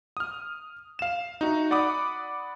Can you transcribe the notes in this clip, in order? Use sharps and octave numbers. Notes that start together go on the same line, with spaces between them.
D#6 F6
F5 E7
D#4 F#4 E5
D5 F#5 B5 D6 D#6